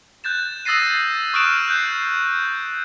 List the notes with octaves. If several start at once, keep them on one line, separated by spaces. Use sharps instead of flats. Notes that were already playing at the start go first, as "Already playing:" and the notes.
F#6 G6 A6 E7
D#6 E6 A6 A#6 C7 D#7
C#6 D#6 F6 F#6 D7 E7
F#6 G6 C7